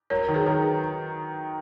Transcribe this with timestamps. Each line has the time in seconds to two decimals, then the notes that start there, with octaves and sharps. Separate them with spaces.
0.10 F#3 A#4 C#5
0.28 D#3
0.34 G#4 B4
0.46 D#3